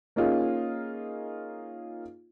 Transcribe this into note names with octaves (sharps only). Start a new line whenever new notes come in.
A#3 C#4 D#4 F4 G#4